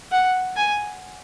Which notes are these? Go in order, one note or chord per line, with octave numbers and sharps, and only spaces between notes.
F#5
G#5